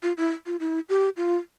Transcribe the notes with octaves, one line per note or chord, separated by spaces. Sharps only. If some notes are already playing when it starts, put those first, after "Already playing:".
F4
E4
F4
E4
G4
F4